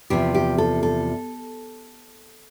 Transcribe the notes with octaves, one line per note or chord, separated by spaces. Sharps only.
E2 C3 F3 G4
G4
A4
A4